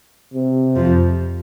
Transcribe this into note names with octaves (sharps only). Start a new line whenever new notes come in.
C3
F2 F3